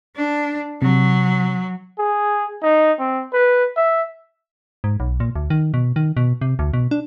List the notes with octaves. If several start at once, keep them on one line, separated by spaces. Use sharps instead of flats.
D4
C3 F#3
G#4
D#4
C4
B4
E5
G#2
B1
A#2
D2
D#3
B2
D#3
B2
C3
D2
B2
D4